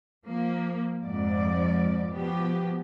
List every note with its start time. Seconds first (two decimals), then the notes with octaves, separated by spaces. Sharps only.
0.24 F3 A#3
1.04 F2 G#2 F3 D5
2.10 B2 F3 B3 G4